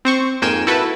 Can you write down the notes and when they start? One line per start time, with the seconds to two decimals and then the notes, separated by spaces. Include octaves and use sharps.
0.05 C4 C5 C#6
0.42 F2 G#2 A#3 G5 G#5 E7
0.67 E4 F#4 A4 B4